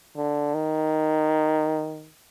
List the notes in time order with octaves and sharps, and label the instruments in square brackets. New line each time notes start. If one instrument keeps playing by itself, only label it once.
[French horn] D3
D#3